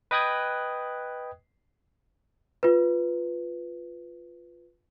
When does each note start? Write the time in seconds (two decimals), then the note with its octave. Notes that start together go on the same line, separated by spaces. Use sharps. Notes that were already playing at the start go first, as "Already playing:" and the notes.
0.11 B4 D#5 G5 D#6 F#6 G#6
2.63 F4 B4